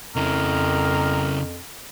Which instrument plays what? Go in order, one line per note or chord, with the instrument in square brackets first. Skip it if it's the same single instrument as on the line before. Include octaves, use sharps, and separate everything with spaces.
[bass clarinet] F2 [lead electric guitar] C#3 E4 [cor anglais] A#4